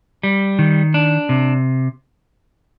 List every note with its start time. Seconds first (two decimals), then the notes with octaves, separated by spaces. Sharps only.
0.23 G3
0.59 D#3
0.94 D4
1.29 C3